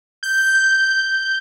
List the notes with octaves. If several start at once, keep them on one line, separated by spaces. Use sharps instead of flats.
G6